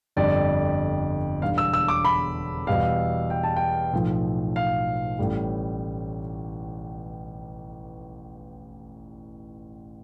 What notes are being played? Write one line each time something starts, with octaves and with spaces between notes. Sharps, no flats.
G1 F2 D3 G3 D5
E1 E2 D3 G3 F5
E6
E6
D6
B5
E2 B2 G3 F5
G5
A5
G5
B1 A2 F3
F5
A1 A2 G3